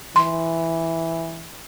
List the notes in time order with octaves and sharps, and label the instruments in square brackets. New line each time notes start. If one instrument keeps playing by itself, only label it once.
[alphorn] E3 [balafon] C6